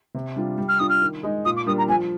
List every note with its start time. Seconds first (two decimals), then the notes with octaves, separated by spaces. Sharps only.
0.15 C3
0.36 G3 D4 F4
0.58 G3
0.68 F6
0.79 D4 F4 D#6
0.89 F6
1.02 D#3
1.23 G#3 D#4
1.45 A#2 D#6
1.56 D6
1.66 G3 A#3 D4 D#6
1.77 A#5
1.88 F3 G#5